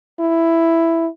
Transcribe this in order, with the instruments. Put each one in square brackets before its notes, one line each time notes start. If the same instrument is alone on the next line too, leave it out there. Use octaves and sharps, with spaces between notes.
[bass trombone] E4